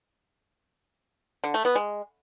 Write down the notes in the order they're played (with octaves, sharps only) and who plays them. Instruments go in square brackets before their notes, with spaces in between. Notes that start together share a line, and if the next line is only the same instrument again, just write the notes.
[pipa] D3
A3
B3
G#3